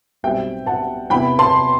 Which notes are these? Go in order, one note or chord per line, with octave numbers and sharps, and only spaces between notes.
B1 B2 G3 C4 E5 G5
F#5 A5
E2 C3 E3 B3 E4 G5 B5
A5 C6